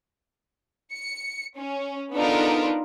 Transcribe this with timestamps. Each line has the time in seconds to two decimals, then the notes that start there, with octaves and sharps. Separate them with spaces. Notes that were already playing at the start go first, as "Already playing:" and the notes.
0.92 C#7
1.56 C#4
2.14 B3 D4 D#4 F4 A4 A#4